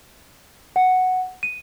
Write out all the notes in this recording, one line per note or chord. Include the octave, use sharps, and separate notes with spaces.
F#5
D#7